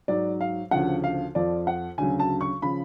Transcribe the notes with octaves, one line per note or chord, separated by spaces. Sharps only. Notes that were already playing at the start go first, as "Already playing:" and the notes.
G#2 F#3 D5
F5
D2 C#3 F3 F#5
F5
F2 F3 D5
F#5
D2 C#3 F#3 G#5
A5
C#6
C#3 F3 B5